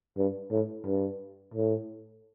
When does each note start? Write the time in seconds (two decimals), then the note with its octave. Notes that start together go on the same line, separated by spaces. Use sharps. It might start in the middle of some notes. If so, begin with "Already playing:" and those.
0.17 G2
0.51 A2
0.86 G2
1.54 A2